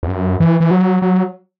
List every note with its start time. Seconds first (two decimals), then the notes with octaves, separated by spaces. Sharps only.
0.03 E2
0.08 F#2
0.40 E3
0.60 E3
0.71 F#3
1.02 F#3